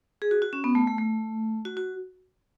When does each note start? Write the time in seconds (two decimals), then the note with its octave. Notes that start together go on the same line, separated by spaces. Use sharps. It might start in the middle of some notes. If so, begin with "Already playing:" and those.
0.22 G#4
0.31 F#4
0.42 F#4
0.53 C#4
0.64 B3
0.75 A3
0.87 A3
0.98 A3
1.65 F#4
1.77 F#4